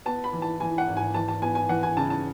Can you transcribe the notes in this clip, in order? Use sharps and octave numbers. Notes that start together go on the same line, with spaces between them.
B3 A5
B5
E3
A5
E3 G#5
F#5
G#1
G#5
E3 A5
A5
B3 G#5
G#5
E3 F#5
G#5
C#3 A5
A5